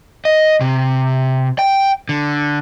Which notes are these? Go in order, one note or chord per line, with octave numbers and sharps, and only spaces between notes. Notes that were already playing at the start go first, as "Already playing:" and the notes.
D#5
C3
G5
D3